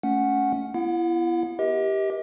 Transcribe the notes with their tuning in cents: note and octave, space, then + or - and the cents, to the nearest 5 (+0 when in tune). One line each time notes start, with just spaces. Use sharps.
A3 -5 C#4 +15 F#5 +0
B3 +0 E4 +35 F#5 -40
G4 +0 A#4 +45 D#5 +40